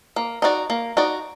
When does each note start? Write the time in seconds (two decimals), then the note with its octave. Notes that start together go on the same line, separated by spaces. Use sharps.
0.16 A#3
0.42 D#4 F#4 D5
0.70 A#3
0.97 D#4 F#4 D5